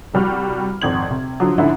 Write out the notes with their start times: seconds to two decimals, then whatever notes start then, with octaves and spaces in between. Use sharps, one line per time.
0.14 C2 G3 F#4 F6
0.82 G#1 F2 G#6 F#7
1.10 C3
1.40 D3 F3 F#3
1.58 G#2 D3 C#4 E4 F#5